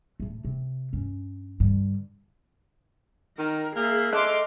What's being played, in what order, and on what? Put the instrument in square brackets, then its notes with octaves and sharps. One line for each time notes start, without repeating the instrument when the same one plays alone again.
[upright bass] A2 A3
C3
G2 C#4
G2 D3
[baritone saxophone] D#3 [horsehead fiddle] A#4
[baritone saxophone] A#3 [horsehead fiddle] G#4 E5
[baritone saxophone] A3 [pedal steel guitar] A4 D#5 F#6 [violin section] C6 D6 F6